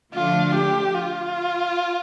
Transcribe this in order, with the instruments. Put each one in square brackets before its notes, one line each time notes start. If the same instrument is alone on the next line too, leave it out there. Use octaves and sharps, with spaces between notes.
[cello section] D3 F3 A3 D4 [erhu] F4
[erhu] G4
F4